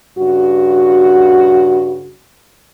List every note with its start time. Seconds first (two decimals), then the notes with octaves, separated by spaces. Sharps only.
0.18 G2 C#3 F#4